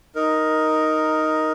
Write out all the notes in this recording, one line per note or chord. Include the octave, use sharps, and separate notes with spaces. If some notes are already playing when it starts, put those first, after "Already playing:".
D#4 A#4